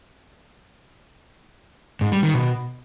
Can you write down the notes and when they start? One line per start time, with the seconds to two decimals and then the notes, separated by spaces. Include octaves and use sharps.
2.01 G#2
2.12 G3
2.23 D#3
2.34 B2